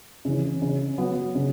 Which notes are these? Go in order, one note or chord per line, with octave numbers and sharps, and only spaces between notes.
C#3 E3
C#3
F#3 B3
C#3